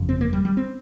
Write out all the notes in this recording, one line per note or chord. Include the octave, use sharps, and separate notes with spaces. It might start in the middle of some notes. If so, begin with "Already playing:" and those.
Already playing: G1 F2 C#3
C4
A#3
G3
G3
C4